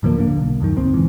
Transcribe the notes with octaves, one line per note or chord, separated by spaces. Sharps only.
D1 D3 F3 A#3
D3 A#3
B1
C#2 F#2 D#3
G1 D#2 C4
B1 G#2 E3